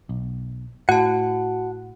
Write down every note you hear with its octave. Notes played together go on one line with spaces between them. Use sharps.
B1
A2 F#4 F#5 A5